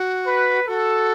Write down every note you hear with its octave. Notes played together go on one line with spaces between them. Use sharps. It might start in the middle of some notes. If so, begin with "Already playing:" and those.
Already playing: F#4
B4
F#4 A4